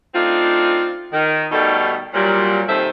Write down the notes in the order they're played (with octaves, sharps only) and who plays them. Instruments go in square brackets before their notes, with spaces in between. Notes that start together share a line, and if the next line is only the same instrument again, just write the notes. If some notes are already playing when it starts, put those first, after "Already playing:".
[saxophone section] A3 C4 D4 D#4 F4
D#3
B2 D#3 G3 A3 D#4 A4
A#2 F#3 G3
D#2 C3 D#3 A4 C5 E5